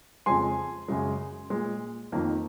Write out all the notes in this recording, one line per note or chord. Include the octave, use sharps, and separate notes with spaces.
F2 C#3 G#3 G#5 C6
F#2 C#3 G#3
A#2 G#3
F2 D#3 A#3